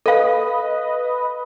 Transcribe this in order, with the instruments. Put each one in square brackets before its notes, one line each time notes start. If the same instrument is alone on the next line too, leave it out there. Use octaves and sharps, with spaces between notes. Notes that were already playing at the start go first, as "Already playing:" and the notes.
[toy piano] A4 F5 [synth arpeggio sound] B4 D#5